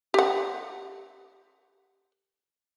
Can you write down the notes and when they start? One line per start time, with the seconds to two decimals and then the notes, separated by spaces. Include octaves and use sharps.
0.14 G4 F#5